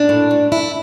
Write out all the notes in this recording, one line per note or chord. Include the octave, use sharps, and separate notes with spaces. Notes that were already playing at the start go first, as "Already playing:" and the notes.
Already playing: A#2 D4
A2
A2
A2 E4